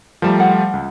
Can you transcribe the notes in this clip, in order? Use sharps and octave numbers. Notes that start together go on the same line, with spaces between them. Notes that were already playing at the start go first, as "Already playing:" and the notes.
F3 G3 A3 C5 A5 A#5
F#5
C#2